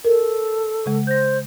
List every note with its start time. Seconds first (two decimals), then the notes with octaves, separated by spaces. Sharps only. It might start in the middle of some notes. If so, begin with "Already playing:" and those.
0.05 A4 A#4
0.86 C#3 G#3
1.07 C5 G6 A#6